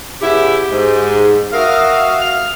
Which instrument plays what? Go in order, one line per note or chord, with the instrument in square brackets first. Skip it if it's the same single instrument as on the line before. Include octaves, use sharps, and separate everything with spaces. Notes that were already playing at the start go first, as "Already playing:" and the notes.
[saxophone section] C#3 B3 E4 [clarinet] G4
[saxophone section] G#2
[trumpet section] F#4 E5 D#6 [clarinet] A#4 [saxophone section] F5
[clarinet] F6